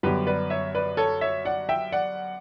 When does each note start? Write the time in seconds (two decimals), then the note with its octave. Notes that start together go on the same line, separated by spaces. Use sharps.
0.03 F#2 D3 G3 B3 G4 B4
0.27 B4 D5
0.50 C#5 E5
0.75 B4 D5
0.97 A4 C#5
1.21 C#5 E5
1.45 D5 F#5
1.69 E5 G5
1.92 D5 F#5